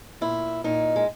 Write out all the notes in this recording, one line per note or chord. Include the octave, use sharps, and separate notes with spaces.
A#2 E4
A#2 D#4
G#3